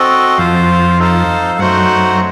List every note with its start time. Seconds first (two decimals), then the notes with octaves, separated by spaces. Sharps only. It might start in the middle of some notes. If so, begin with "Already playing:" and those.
Already playing: C4 F#4 A4 D#5
0.37 F2 F4 C5 F5
0.99 D#4 A4 C5 F5
1.59 F#2 A3 D#4 F#4 C5 F#5